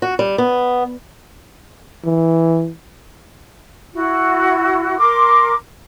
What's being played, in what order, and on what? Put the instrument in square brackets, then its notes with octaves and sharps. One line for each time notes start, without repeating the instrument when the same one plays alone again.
[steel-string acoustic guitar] F#4
G3
B3
[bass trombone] E3
[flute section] E4 F#4
A#4 C6 D6